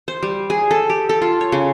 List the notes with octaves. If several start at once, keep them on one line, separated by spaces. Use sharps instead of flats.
C5
G3
G#4
A4
G4
A4
F4
C#5
C#3